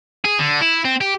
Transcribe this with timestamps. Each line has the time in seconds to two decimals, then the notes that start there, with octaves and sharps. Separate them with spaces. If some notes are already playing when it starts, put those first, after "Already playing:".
0.24 G#4
0.39 D3
0.61 E4
0.85 C4
1.01 G4